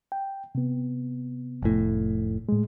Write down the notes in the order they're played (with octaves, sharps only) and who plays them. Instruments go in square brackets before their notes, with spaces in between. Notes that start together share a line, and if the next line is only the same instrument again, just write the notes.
[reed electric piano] G5
C3 B3
[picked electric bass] F1 A2
[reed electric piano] A2 G#3